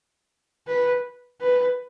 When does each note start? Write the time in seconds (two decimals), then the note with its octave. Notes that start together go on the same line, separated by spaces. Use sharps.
0.68 B4
1.41 B4